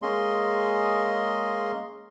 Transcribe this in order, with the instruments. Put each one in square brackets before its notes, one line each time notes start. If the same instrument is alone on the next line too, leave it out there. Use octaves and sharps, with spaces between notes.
[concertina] G#3 A#3 C#4 G#4 D#5 C6